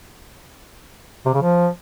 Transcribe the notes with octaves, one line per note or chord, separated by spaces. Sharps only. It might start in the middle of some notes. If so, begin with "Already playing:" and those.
C3
C#3
F3